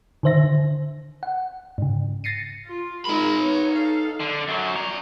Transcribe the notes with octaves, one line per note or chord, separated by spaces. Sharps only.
D3 D#3 C5 E5 A#6
D3
F#5
G#2 C#3
A6 A#6 C7 C#7 D#7
F4
G#3 D#4 A#4 B5
B3 C#5
A4 F5
D3
F#2 F#3
D5 A#5